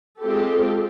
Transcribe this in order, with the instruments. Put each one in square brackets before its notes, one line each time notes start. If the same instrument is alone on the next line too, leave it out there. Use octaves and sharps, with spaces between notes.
[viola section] G#3 C4 F4 G4 A4